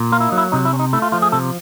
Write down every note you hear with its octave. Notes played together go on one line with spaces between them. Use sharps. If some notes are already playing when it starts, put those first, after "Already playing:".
Already playing: A#2
A#3 F4
E4
F#3 D#4
E4
C3 D#4
E4
C#4
D#4
A3 E4
F4
F3 F4
G#4
C3 A4